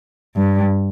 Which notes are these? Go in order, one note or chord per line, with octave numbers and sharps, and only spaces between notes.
G2